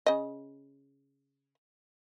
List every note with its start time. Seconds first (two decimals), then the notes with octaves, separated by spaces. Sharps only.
0.06 C#3 D#5